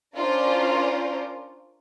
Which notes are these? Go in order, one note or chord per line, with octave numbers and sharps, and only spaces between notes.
C#4 D4 F4 A#4 C5 D5